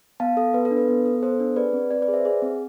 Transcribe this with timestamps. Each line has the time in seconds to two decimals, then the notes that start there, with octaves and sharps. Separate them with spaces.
0.20 B3 F5 A5
0.37 A4
0.54 B3 B4
0.65 A4
0.71 D4
0.77 B4
0.88 B3
1.05 A4
1.23 B3 A4 C5
1.40 D4
1.56 G#4 B4 D5
1.73 C4
1.91 C4 B4 D5
2.02 B4 D5
2.08 G#4
2.13 C5 E5
2.25 G#4
2.42 C4